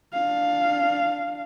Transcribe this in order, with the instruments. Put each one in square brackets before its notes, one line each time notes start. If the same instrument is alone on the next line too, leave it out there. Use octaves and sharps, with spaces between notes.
[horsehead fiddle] D4 F5